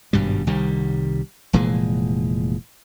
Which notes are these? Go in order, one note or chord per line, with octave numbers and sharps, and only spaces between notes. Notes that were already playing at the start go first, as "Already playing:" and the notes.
G#1 G2 B2 G3
C2 D#3 G3
F1 A#2 E3 G#3